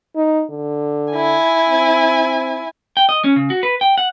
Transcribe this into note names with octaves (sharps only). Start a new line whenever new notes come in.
D#4
D3
E4 G#5
C4
G5
D#5
C#4
C#3
F#4
B4
G5
F#5